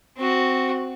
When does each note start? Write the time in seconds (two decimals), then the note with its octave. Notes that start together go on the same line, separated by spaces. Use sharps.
0.16 C4 F#4